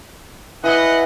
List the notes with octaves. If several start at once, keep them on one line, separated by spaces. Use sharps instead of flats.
E3 B4 D#5 F#5